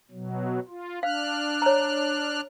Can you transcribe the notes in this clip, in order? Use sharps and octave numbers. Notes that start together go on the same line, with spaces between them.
B2 F#3
F4
D4 F5 F6 F#6
C#5 A#5